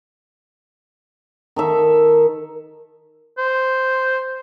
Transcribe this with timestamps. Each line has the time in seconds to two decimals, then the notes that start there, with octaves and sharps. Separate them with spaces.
1.56 D#3 A4 E5
3.38 C5